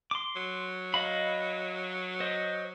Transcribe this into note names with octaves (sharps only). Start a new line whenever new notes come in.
C6 D6
F#3
D#5 F5 B5
C5 D#5